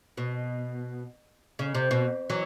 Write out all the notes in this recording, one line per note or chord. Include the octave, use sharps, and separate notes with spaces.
B2
C#3
C3
B2
E3 F#3